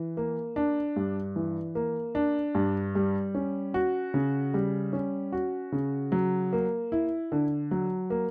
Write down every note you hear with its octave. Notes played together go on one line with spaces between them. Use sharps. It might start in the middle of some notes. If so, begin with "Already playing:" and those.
Already playing: E3
A#3
D4
G2
E3
A#3
D4
G2
G3
C#4
F#4
C#3
G3
C#4
F#4
C#3
F#3
A#3
E4
D3
F#3
A#3